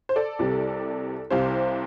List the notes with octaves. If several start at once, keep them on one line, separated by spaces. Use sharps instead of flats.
C5
A4 D5
C2 C3 G3
C2 C3 G3 C5 F5